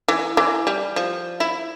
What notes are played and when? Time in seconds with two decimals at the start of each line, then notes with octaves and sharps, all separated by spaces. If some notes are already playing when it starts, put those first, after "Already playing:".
0.08 E3
0.37 E3
0.67 G3
0.96 F3
1.40 E4